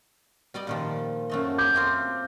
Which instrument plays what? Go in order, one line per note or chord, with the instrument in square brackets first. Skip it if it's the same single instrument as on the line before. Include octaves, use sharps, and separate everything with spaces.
[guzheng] G3 D5 D#5
A#2 D#3 F3
F#2 A3 D#5
[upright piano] D6 G6
[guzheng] A3 C4 F4